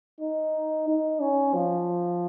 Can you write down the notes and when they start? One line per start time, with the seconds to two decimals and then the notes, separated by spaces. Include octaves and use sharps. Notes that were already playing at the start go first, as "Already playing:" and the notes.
0.20 D#4
0.88 D#4
1.21 C#4
1.54 F3